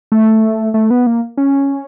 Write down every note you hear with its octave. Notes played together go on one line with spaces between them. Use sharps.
A3
A3
B3
A#3
C#4